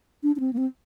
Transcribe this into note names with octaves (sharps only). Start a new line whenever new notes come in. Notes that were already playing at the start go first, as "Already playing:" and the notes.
D4
D4
C4
A#3
C4